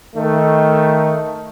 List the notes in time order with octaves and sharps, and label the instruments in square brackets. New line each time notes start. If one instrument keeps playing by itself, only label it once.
[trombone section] D#3 A3